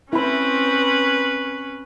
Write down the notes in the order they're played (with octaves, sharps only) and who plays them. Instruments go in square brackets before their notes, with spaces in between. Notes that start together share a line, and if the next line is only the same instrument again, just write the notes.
[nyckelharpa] C4 C5 [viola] C#4 B4 [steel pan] E4 B5